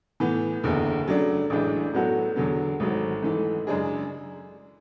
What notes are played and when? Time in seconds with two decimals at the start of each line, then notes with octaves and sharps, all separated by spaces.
0.20 A2 E3 B3
0.63 F#1 E2 D3
1.06 C#3 F#3 A3 D4
1.50 A1 A2 E3 G#3 D4
1.93 A2 F#3 B3 F#4 A4
2.36 E2 D3 F#3 B3
2.80 G#1 G#2 F#3 A3
3.23 G#2 E3 A3
3.67 F#2 C#3 G#3 D4 G#4